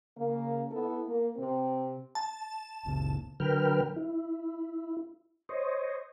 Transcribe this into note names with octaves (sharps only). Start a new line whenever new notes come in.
C#3 A#3
B3 E4 A4
A#3
C3 C4
A5
F#1 C#2 C#3
D3 F#3 A#4 B4 G5 F6
E4
C5 C#5 D#5